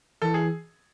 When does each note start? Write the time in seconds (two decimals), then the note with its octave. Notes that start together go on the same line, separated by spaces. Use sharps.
0.22 E3 A4
0.34 G#4